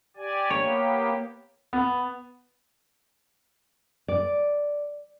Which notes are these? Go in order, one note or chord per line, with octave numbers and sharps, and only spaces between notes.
G4 D5 G#5
A#3 B3 G4 C#5
B3
D5